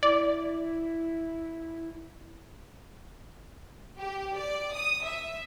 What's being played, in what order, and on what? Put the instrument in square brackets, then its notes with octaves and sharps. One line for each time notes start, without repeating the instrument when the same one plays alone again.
[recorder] E4 [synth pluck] D5
[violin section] G4
D5
D#6
E5